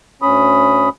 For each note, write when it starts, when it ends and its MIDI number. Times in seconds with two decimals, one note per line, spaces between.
0.22 0.89 38
0.22 0.89 61
0.22 0.89 83
0.22 0.89 87